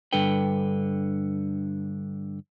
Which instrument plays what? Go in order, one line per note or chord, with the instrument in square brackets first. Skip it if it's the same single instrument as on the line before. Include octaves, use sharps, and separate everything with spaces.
[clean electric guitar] G2 D3 A4 B4 G5